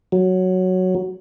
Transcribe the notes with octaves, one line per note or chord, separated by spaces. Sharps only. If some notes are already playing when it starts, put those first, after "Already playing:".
F#3